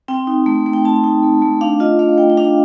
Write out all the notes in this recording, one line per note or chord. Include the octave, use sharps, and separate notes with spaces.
C4 G5
D#4
A3
A3
G5
C4 A5
D#4
A3
A3
D4 F5
F4 D#5
A3 F5
A3 G5
G5
D4 F5